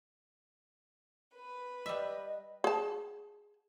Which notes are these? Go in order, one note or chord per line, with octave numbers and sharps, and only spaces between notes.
B4
G3 D#5 E5
G#4 A5